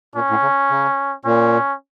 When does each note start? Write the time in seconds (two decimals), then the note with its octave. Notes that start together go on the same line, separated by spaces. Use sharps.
0.15 A#2 C#4
0.30 A2
0.42 C#3
0.71 C#3
1.25 A#2 C#4